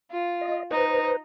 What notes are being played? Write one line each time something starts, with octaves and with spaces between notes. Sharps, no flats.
F4
D#5
D#4 B4 C5